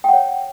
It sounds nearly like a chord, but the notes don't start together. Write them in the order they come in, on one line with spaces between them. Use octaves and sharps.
G5 F#5 C#5